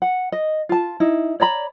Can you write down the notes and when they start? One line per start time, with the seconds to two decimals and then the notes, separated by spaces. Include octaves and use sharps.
0.02 F#5
0.32 D#5
0.69 F4 A5
1.00 D#4 E4
1.40 C#5 D5 A#5 B5